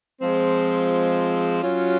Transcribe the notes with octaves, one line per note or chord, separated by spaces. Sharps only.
F3 G#3 C4
F#3 C#4 F4